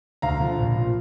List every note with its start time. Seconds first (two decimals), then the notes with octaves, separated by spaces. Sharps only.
0.22 D2 F5 A#5
0.40 D3 F3
0.58 A#1
0.75 A#2 F3